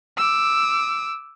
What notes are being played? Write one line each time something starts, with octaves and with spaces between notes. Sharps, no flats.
D6 E6